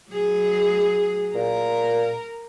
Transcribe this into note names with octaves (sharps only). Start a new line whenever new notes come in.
F#3 G#4
A#2 A#4